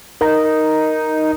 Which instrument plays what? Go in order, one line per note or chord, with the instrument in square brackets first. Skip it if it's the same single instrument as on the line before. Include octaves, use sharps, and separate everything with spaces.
[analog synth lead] D#4 [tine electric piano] A#4